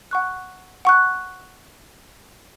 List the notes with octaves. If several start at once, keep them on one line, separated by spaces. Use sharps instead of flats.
F#5 C#6 F#6
F#5 C#6 F#6